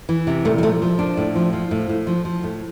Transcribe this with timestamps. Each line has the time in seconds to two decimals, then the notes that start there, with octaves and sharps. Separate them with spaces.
0.09 E3
0.27 C3
0.45 A#2 A3
0.58 G3
0.63 F3 A3
0.82 F3
0.99 A#2 D4
1.17 A2
1.35 F3
1.53 F3
1.71 A2
1.89 A2
2.07 F3
2.25 F3
2.43 A2